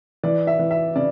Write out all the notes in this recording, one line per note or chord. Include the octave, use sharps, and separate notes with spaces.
E3 D5
E5
E3
E5
C#3 D5